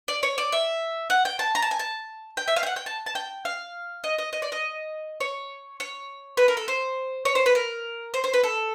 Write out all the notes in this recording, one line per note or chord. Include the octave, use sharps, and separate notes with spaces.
D5
C#5
D5
E5
F#5
G5
A5
A#5
A5
G#5
A5
G5
E5
F5
G5
F#5
G5
A5
A5
G5
F5
D#5
D#5
D#5
D5
D#5
C#5
C#5
B4
A#4
A4
C5
C#5
C5
B4
A#4
C5
C5
B4
A4